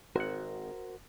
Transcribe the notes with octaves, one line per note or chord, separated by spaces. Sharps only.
G#1 F#4 A#4 C5 F#5